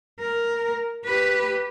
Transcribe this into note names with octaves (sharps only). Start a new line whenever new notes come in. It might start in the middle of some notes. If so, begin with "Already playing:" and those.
A#4
G4 B4